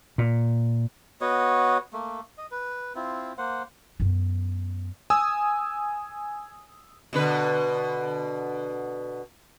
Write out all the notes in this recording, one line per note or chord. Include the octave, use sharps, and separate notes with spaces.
A#2
B3 F#4 C#5 D#5
A3 A#3
D#5
B4
C4 E4 F4
A#3 C5 F#5
F#2 B3
G#5 D#6 E6
B2 D3 B4